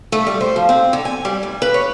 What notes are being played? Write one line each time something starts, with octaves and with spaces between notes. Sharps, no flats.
A3
G3
C5
F3
C4
D3
G#5
G3
D2
B4
C#5